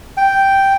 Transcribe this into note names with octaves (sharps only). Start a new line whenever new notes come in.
G5